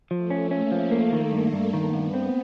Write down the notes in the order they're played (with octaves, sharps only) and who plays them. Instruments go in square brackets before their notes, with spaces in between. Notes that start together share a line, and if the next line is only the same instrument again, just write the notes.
[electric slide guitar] F3 [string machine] A3
[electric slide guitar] C#4
[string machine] A#3 [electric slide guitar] C#4
[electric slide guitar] F3
A#3
D#3
G2
G2
[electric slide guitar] D#3 [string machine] B3
[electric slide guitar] G2
C4